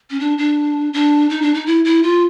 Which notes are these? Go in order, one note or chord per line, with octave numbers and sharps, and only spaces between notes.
C#4
D4
D4
D4
D#4
D4
D#4
E4
E4
F4